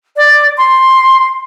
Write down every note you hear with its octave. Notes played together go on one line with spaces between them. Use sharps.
D5
C6